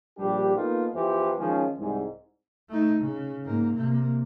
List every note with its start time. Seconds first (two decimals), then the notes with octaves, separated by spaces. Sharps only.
0.18 A#1 G3 D4 G4
0.55 A#3 B3 D#4 F4 A4
0.94 E2 E3 F3 G4 C5
1.37 D#3 F3 G#3 C#4
1.79 C2 G#2
2.69 A3 D#4
3.00 C#3
3.44 G#2 A#3
3.75 C3 A#3